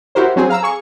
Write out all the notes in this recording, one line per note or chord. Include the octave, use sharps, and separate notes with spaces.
E4 F#4 G4 A#4 C5
F#3 C4 G#4
F5 A#5 E6
G#4 C#6